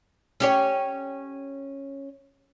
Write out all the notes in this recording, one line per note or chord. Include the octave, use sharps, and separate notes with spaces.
C#4 G4 C#5